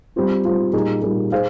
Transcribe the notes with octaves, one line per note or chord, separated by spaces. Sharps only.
G3 C4 F4
G3 C4 F4
A#2 G3 A#3 D#4 G#4
A#2 G3 A#3 D#4 G#4
G#4 C5 F5